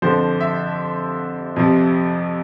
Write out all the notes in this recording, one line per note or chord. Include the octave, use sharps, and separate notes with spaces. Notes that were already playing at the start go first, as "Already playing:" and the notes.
F2 D3 F3 C5
E5
F2 C3 F3